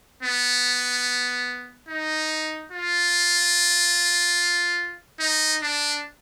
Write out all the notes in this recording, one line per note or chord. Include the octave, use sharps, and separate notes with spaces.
B3
D#4
F4
D#4
D4